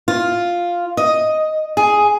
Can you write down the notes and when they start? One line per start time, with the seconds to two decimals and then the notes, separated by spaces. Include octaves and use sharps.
0.08 F4
0.97 D#5
1.77 G#4